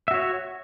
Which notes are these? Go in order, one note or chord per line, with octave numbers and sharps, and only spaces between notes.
F#4 C#5 E5